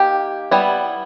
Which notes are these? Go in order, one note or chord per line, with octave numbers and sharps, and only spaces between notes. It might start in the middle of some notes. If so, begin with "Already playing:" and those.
Already playing: A#3 D#4 G4
G3 B3 E4